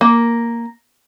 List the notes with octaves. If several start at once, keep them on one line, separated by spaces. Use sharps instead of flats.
A#3